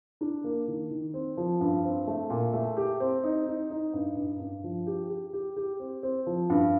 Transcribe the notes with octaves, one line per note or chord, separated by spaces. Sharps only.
D4
A#3
D#3
D#3
C4
F3
G2
C4
A3
A#2
A3
G4
C4
D#4
D#4
D#4
G2
G2
G2
F3
G4
G4
G4
G4
C4
C4
F3
G2